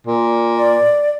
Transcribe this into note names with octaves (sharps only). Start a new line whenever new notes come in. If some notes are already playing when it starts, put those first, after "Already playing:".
A#2
D5